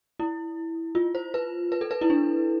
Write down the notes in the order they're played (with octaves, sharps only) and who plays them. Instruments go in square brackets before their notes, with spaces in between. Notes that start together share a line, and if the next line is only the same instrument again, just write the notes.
[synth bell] E4
F4
C5
B4
B4
A4
B4
E4
D4